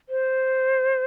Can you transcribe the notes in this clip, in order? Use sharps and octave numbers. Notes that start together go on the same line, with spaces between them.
C5